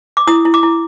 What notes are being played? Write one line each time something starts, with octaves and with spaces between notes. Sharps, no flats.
D6
E4 D#6
E4
D6
E4